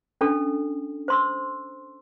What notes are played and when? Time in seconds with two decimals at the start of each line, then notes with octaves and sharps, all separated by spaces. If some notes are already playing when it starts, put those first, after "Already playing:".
0.21 C#4 D4 A4
1.08 C5 C6 E6